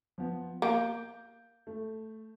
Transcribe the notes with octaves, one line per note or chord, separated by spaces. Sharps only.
F3 B3
A#3 G6 D7
A3